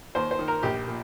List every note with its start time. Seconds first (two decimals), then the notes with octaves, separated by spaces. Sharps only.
0.15 D#2 C5
0.31 C5
0.39 D#3
0.48 A#4
0.63 A#1 G4
0.88 A#2